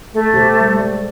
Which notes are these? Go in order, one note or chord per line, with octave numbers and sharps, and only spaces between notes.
A3
B2 G4 C5
G3
G#3 D5